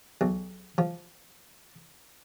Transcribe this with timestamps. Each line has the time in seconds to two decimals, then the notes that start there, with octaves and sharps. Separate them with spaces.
0.21 B1
0.78 F3